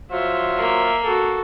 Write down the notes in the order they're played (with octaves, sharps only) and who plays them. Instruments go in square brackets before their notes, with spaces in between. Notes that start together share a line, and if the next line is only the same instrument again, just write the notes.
[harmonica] F#3 F4 C5 [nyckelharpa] E5
[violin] A#3
[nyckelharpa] F#4 A4